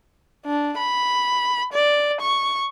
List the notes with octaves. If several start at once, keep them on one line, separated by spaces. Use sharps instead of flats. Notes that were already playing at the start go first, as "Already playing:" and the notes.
D4
B5
D5
C#6